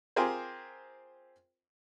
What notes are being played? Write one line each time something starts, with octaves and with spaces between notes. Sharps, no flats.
C4 F4 G4 G#4 A#4 C5